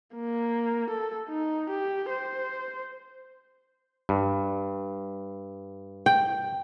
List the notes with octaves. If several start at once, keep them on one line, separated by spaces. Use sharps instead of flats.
A#3
A4
D#4
G4
C5
G2
G5